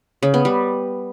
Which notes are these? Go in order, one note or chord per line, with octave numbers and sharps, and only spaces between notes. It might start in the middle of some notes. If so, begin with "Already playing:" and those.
C#3
B3
G3